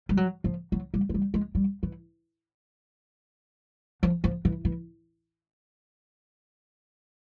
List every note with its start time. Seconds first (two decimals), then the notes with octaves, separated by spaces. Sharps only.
0.09 G3
0.17 F#3
0.44 F3
0.72 F#3
0.94 G3
1.09 G#3
1.14 G3
1.34 G#3
1.55 G3
1.83 E3
4.03 F3
4.24 F3
4.45 E3
4.65 E3